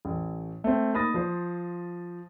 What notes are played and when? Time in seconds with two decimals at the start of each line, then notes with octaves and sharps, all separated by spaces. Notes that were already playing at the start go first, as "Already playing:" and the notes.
0.05 A1
0.64 A3 C4
0.93 A#3 D#4 B5 D#6 A6 A#6
1.14 F3 C5